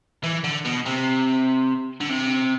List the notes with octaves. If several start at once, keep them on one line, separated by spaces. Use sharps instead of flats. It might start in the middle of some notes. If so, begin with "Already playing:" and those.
E3
D3
B2
C3
D3
C3